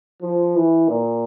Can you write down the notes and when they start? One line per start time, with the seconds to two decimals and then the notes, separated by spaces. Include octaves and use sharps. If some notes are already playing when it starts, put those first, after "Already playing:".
0.22 F3
0.56 E3
0.88 A#2